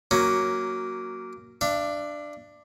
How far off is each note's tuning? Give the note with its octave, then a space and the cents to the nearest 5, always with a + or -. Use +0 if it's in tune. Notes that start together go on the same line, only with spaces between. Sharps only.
F#3 +0 A#3 +0 C#4 +0
D4 +10 F5 -45